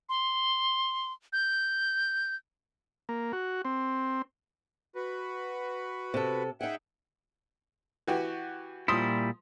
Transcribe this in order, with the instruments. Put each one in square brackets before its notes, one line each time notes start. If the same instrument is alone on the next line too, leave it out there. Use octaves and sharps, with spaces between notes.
[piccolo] C6
G6
[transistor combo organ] A#3
F#4
C4
[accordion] F#4 B4
[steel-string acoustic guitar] C3 A4
[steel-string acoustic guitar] D#4 G#4 [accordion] E5 F#5 G5
[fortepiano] E3 F#4 G4
[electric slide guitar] A#2 G3 E4 [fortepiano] F3 C6 D#6